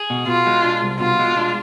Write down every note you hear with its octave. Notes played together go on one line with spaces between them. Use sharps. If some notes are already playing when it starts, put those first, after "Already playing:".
Already playing: G#4
B2
B2 F4
G#3
D4
C2
B2 F4
G#3
D4